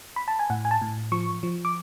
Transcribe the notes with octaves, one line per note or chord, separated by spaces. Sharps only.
B5
A5
G#5
A2 F#5
G#5
A5
A2
F3 C#6
F3
D6